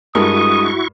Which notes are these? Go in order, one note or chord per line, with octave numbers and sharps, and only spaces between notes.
G2 G#3 E4 F#4 A#4 C#6 D#6